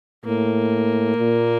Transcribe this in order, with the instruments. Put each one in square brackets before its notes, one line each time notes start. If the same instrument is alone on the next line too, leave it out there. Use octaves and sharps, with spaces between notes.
[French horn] A2 [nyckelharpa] A#3
[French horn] A#2